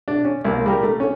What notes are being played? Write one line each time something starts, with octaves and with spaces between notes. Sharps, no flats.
D4
C#4
C2 A#3
G3 G4 A#4
A3
C#4